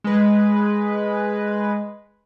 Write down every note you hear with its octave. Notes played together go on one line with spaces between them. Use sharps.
G#3 B4